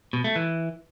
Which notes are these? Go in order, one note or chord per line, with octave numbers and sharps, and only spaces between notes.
B2
A3
E3